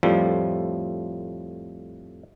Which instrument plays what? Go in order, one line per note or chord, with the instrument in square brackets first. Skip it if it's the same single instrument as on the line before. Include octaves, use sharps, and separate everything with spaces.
[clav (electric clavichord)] F2 A2 F3 G3